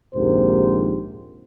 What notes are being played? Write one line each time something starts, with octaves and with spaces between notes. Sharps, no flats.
A#1 D#2 G#2 C3 A#4 C5